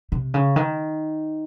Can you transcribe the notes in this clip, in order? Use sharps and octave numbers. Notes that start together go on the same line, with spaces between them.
C3
C#3
D#3